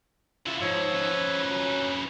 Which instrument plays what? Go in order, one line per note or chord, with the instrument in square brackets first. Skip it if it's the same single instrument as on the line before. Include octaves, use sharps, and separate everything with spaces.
[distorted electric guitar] C#3 E4 [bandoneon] F4
[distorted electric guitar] G#2 [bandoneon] F3 C#5 E6
[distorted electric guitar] C#3 B4
[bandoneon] F#3